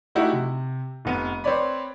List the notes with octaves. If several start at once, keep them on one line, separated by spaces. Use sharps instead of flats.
A3 D#4 E4 F#4 G4
C3
F1 B3 D#7
C4 B4 C#5 D5 B5